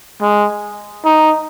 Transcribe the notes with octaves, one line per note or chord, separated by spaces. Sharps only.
G#3
D#4